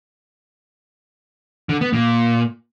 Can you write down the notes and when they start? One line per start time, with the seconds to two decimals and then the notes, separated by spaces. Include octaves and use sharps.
1.69 D3
1.81 B3
1.93 A#2